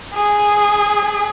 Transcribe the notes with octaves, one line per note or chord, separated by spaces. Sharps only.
G#4